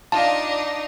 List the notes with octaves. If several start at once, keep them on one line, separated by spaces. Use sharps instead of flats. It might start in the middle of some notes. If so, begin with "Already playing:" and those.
D4 D#4 F4 A5